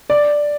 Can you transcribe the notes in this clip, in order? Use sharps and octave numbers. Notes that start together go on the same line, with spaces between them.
D5